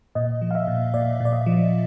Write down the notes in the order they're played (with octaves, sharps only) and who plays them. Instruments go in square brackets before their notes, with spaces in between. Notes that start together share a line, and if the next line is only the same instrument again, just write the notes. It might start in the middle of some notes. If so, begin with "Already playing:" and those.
[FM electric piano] A#2 D#5
F3
F5
E5
A#2
A#2 D5
A#2 D5
D#5
F3